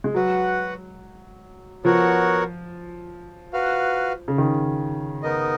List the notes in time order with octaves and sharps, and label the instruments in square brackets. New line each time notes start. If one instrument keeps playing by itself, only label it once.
[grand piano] G#3
[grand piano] F#3 [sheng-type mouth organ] F#4 B4 F#5
[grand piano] F3 [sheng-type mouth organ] B3 F#4 A#4 C#5 F#5
[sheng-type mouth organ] F#4 B4 F5
[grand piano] C#3
D#3
[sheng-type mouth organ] B3 D#4 A#4 D#5